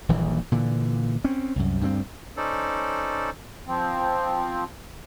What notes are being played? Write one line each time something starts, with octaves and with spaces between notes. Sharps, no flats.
D#1 A#1 D#2 E3
A#2 D3 E3
C4 C#4
C2 F#2
D2 G2 G#3 C4
C#4 D#4 A4 C5 D5
F3 C4